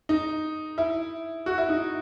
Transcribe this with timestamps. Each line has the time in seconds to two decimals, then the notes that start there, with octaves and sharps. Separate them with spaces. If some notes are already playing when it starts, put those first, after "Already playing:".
0.09 D#4
0.78 E4
1.46 F#4
1.58 E4
1.69 D#4